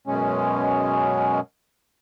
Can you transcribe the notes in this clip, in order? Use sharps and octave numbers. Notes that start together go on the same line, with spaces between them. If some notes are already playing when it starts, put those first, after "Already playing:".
F#2 B2 G#3 C#4